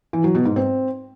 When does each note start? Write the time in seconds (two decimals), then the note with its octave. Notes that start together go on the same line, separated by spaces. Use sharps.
0.13 E3
0.24 F#3
0.35 B2
0.45 G#2
0.56 C4